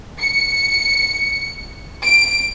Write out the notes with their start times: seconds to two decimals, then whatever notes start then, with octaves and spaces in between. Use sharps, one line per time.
0.20 C#7
2.03 D7